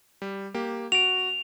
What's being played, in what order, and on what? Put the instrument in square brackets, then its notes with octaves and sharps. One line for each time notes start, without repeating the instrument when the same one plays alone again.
[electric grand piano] G3
A#3 G4
[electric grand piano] F#4 D7 [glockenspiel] F7